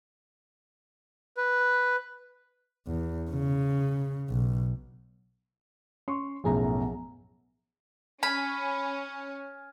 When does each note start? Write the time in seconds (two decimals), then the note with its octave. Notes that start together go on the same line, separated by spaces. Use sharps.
1.37 B4
2.87 E2
3.31 C#3
4.30 B1
6.08 C#4 C6 C#6
6.44 B1 F#2 A2 F3 B3 G#4 A#5
8.23 C#4 G#5 B5 F6 G#6